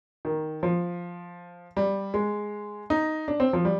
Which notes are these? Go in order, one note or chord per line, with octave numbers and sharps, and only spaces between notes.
D#3
F3
G3
G#3
D#4
D4
C4
F3
G3